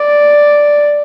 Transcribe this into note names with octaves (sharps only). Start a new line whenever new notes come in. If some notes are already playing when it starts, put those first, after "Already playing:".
Already playing: D5